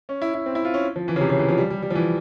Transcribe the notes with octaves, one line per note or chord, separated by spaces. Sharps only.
C#4
E4
E4
C4
E4
F4
C#4
F3
E3
C#3
C3
C#3
E3
F3
G3
G3
G3
F3
E3